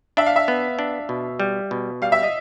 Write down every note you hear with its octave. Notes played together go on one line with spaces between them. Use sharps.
D4 E5
F5
E5
B3
D4
B2
G3
B2
G3 F5
E5
D#5